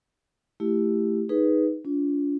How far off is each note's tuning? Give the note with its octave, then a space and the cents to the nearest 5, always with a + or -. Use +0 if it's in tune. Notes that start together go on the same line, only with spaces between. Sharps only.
A3 +0 E4 +5 G4 +0
D#4 +0 G#4 +0 B4 +0
D4 -45 F4 +0